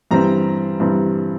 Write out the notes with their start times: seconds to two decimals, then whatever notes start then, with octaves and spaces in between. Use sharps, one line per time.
0.11 G2 E3 G3 C4 A#5
0.80 G2 E3 G3 C4